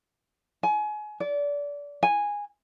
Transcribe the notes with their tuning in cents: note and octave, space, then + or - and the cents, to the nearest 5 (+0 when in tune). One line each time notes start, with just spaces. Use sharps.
G#5 +30
D5 -25
G#5 -10